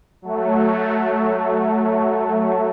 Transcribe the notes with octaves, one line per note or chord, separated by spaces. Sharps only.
F#3 A3